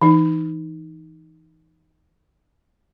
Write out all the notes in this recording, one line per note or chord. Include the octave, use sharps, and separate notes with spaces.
E3 D#4